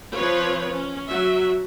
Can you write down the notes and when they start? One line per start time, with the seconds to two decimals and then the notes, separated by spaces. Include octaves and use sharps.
0.16 F3 C4 B4 C#5
0.72 C#4
1.11 F#3 F#4 E5